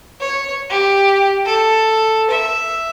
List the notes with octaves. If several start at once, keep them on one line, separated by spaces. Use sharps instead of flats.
C#5
G4
A4
E5